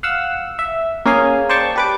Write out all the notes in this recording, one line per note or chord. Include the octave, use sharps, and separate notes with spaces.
F5 F#5 E6
E5
A#3 C#4 G#4 F5 G#5
C5 D5 G5 A5 C#6
G4 B4 D6